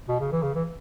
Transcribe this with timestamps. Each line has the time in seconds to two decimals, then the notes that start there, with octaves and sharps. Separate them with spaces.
0.08 B2
0.20 C#3
0.32 E3
0.42 C#3
0.55 E3